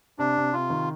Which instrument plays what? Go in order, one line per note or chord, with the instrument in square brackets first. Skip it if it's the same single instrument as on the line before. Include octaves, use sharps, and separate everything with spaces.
[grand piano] C3 [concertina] D4
[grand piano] C3
[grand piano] C3 [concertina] F4
[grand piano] D#3